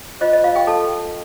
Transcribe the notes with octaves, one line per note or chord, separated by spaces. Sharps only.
F4 C5 D#5
D#5
F4 F5
G4 G5
A4 A5